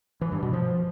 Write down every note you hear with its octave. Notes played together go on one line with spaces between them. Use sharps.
E3
G2
B2
F3